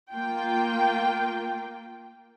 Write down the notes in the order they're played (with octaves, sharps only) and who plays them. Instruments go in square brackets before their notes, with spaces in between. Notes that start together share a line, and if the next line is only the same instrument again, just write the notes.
[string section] A#3 F4 G5